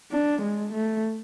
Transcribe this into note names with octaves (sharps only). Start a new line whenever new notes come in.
D4
G#3
A3